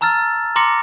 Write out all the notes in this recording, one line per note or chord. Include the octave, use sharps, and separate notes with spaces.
A5 A#5 E6 F6 A6
A#5 C6 D6 A#6 C#7